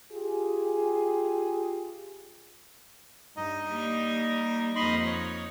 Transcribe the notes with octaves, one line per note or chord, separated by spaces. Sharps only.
F4 G4 G#4
G2 D#4 D#5
G3 A#3
F2 A#3 D#4 D#5 B5 C6
C#5